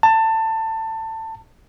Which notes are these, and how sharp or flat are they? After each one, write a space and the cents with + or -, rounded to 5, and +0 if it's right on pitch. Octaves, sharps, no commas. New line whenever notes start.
A5 +20